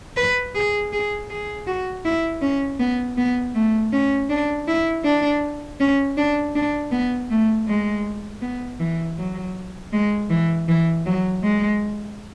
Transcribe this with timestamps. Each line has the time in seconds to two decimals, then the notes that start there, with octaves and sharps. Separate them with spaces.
0.17 B4
0.55 G#4
0.93 G#4
1.30 G#4
1.67 F#4
2.05 E4
2.42 C#4
2.79 B3
3.18 B3
3.55 A3
3.93 C#4
4.30 D4
4.68 E4
5.05 D4
5.80 C#4
6.17 D4
6.55 D4
6.92 B3
7.30 A3
7.67 G#3
8.42 B3
8.80 E3
9.17 F#3
9.93 G#3
10.30 E3
10.68 E3
11.06 F#3
11.43 G#3